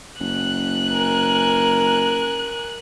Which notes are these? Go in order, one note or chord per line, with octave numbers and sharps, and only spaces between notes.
F#1 F#6
A#4 G#5